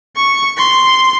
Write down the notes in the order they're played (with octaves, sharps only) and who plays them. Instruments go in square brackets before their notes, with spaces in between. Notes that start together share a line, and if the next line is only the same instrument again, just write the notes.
[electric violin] C#6
C6